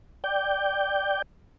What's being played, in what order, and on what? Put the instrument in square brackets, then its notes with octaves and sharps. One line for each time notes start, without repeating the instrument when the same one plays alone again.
[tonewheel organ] D5 G5 G6